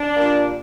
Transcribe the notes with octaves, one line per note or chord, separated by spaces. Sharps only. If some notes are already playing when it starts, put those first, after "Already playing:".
Already playing: D4
A#2 G3 A#3